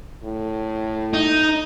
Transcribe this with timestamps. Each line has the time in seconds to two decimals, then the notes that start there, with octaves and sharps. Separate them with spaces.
0.23 A2
1.13 D#4